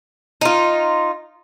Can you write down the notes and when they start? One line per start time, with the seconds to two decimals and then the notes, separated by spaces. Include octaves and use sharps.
0.41 D#4 F4